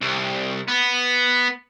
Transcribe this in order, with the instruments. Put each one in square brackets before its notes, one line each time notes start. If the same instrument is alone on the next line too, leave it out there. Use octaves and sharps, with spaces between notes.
[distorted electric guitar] C2
B3